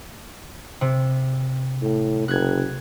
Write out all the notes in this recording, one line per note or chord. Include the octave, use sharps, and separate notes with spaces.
C3
A2
F#1 F#6 G#6